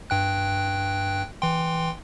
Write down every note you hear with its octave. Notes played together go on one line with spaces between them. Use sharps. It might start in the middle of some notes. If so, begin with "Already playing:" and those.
G2 G5 F#6
E3 G5 C6